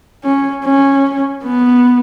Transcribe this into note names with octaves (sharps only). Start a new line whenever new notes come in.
C#4
C#4
B3